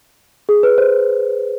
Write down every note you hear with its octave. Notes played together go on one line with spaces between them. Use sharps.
G#4
B4
C5